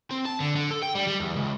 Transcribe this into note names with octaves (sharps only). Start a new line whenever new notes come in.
C4
A5
D3
D3
A4
G5
G3
G3
E2
C#2